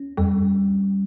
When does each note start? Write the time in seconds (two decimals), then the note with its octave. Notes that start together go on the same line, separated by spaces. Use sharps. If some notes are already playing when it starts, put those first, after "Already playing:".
Already playing: C#4
0.17 F2 G3